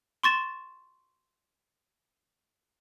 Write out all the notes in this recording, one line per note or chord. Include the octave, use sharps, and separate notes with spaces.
C6 C#6 A6 E7